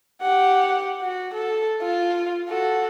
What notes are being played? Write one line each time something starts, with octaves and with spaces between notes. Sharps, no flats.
G4 F#5
F#4
A4
F4
F#4 A4